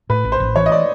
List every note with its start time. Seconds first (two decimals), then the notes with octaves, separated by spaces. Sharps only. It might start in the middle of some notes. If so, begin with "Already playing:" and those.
0.10 A2 B4
0.25 A1
0.32 C5
0.40 A1
0.56 E3 C#5
0.66 D#5
0.72 D5